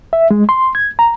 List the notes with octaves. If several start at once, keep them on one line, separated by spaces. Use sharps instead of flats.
E5
G#3
C6
G#6
A#5